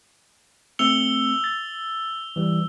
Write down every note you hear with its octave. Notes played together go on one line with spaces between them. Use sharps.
A3 C4 E6 C#7 F7 G7
A6
E3 G3